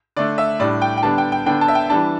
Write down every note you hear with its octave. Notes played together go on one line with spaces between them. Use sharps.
D3 A3 D4 D5
E5
A2 G3 D4 D5
G5
G5
D3 G3 B3 D4 A5
G5
G5
D3 B3 D4 G5
A5
E5
G5
E3 G3 D4 A5